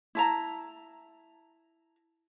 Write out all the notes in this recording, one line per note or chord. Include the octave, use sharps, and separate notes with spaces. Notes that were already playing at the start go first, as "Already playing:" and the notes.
E4 A5 A#5